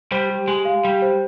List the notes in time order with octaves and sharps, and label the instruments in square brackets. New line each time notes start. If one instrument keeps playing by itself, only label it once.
[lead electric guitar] G3 [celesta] C5
[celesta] G4
[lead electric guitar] G#3 [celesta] G4
[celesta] F5
[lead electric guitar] G3 [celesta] G4
[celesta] C5